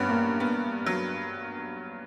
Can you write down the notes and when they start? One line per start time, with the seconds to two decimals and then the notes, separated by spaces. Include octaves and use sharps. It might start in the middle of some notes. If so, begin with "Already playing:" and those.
Already playing: G2 B3 C#4
0.09 A#3
0.40 B3
0.86 F#3